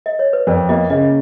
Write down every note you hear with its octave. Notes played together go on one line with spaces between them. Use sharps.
D#5
C#5
B4
F2 A#4
A#3 D#5
C#3 D#5